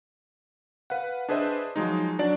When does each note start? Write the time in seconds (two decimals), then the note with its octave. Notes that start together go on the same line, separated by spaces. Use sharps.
0.90 B4 F5 F#5
1.29 D4 G#4 B4 C5 D#5 E5
1.76 F3 F#3 G#3 D#4
2.19 F#3 D4 D5